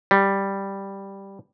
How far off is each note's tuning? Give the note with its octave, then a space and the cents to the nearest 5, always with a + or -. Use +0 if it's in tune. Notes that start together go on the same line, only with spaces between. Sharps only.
G3 +0